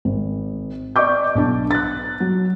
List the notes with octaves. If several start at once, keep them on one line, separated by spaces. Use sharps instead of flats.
G#1
D5 D#5 C#6 D6 G6
B1 D4 A5
F#6 A6
F#3